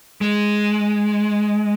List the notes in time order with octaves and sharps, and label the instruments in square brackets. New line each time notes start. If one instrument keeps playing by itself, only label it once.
[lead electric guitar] G#3